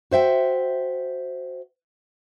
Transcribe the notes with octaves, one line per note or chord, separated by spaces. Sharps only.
F#4 C5 E5 G5